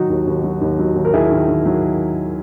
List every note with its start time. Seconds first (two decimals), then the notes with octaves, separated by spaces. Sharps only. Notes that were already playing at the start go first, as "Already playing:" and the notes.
Already playing: D#3 F#3 D#4 F#4
0.10 D#2
0.27 D#2
0.44 F#3
0.61 D#2
0.79 F#3
0.96 D#2
1.05 A#4
1.13 D#2 E4 G#4
1.31 D#3
1.48 D#3
1.66 F#3